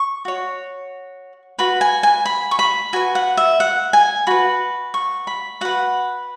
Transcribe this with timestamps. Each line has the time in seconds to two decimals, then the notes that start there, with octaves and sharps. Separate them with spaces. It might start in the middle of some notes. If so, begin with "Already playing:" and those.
Already playing: C#6
0.25 F#4 C#5
1.58 F#4 B4 B5
1.81 G#5
2.03 G#5
2.25 B5
2.51 C#6
2.59 B5
2.93 F#4 B4 G#5
3.15 F#5
3.37 E5
3.60 F#5
3.93 G#5
4.27 F#4 B4 B5
4.94 C#6
5.27 B5
5.61 F#4 B4 F#5